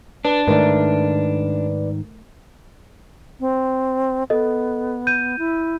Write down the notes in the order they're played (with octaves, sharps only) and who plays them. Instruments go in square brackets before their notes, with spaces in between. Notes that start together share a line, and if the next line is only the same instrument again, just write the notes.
[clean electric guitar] D4 [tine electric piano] B4
[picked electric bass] G#2 D#3 [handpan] A3 A#4 [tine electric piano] B4 D5
[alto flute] C4
[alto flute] B3 [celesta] A4 D#5
[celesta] G6 D#7
[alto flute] E4